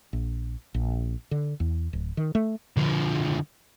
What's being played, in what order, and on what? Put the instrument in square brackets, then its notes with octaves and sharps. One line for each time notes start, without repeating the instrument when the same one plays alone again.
[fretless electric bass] A#1
A#1
D3
E2
D1
D#3
A3
[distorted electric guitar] D3 F3